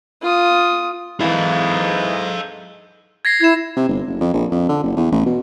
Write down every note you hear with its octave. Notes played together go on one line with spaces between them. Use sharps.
F4 D#6
G#2 E3 E4 A4 D#5 F5
G#6 A#6 C7
E4 G#6 E7
C3
G1
F#1
F2
A#1
F2
D3
F#1
E2
A1
B2